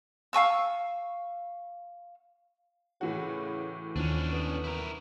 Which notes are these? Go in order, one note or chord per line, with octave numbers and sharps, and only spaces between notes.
F5 G#5 C#6 E6
A2 C#3 E3 F#4
D#2 F3 C#4 D4
B3
E4 A#4